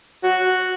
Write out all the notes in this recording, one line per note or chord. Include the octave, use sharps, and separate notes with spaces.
F#4